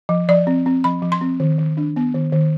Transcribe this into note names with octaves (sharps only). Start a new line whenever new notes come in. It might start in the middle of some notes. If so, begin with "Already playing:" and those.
F3
F3 D5
C4
C4
F3 B5
F3
C6
C4
D#3
D#3
D4
B3
D#3
D#3